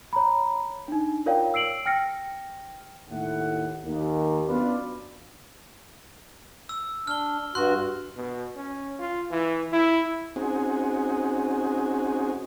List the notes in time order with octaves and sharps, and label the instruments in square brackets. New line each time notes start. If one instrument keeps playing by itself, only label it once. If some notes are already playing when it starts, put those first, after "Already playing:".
[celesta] C#5 A#5 B5
D4 D#4
F4 A#4 C#5 D5 F5 G5
E6 C7 D7 F#7
G5 F6 A#6 C#7
[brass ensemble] D#2 A2 F#5
D#2
F#2 B3 D4 F4 B4 D5
[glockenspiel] E6
[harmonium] D4 [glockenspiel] F6 G7
[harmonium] G2 F#4 [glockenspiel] C6 F#6
[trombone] B2
C#4
F4
E3
E4
[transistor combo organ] C4 C#4 D#4 F#4 G#4